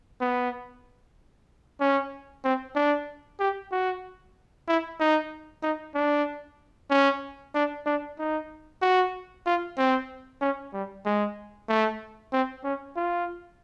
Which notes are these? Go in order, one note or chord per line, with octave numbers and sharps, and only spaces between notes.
B3
C#4
C4
D4
G4
F#4
E4
D#4
D#4
D4
C#4
D4
D4
D#4
F#4
F4
C4
C#4
G3
G#3
A3
C4
C#4
F4